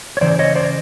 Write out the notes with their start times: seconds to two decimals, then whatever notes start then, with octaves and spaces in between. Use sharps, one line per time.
0.17 C#5
0.21 C#3 E3 C5 D5
0.39 C#5 D#5
0.56 C5 D5